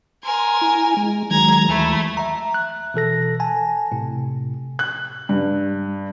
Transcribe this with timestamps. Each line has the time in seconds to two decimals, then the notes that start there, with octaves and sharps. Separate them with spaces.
0.23 A#4 G#5 C6
0.62 E4
0.97 G#3
1.31 D#3 F#3 G#3 A#5 G#6
1.68 D#2 E3 A3 B5
2.17 E5 A#5
2.54 F#6
2.94 B2 E3 A4 A#6
3.40 G#5 A5
3.92 A2 C3
4.79 F#6
5.29 G2